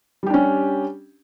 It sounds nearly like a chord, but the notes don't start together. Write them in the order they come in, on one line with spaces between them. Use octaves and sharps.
G3 G4 D4 C#4